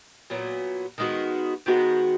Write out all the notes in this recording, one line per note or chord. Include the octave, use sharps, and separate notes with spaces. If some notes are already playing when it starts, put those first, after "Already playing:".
A#2 F#3 B3 F#4
D#3 G#3 B3 F#4
D#3 G#3 B3 F#4